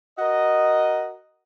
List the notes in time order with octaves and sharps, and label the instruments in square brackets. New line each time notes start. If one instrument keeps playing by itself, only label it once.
[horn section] F#4 A#4 D#5